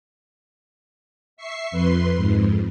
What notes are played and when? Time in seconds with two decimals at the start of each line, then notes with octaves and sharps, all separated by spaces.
1.37 E5 C#6 C7
1.71 F2 B4 C6
2.17 F2 G#2